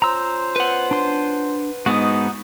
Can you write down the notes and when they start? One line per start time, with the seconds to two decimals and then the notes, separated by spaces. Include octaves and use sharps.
0.02 C#4 F4 C5 A#5 E6
0.56 B4 F#5
0.91 D4 C6
1.86 G#2 B3 D#4 F#4 D#6